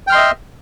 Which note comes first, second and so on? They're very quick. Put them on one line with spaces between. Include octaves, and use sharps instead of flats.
G5 F6 C6 D#5 E5